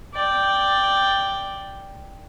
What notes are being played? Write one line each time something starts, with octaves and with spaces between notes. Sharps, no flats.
D5 G5